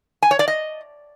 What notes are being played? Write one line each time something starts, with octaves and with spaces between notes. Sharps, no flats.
G#5
C#5
D5
D#5